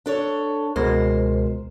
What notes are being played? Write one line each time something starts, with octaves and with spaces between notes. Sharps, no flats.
D4 A4 C#5
C#2 B2 G#3 A#4 C5